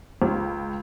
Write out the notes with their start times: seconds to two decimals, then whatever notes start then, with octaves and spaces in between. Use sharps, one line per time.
0.22 C#2